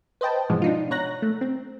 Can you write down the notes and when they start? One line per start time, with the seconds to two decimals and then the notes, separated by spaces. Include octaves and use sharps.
0.21 B4 C5 D#5 G5 A5
0.49 G#2 B2 E3 F3 G#3
0.62 D4 D#4 F4
0.91 B2 C#5 A#5 F#6 A#6
1.22 A3
1.41 C4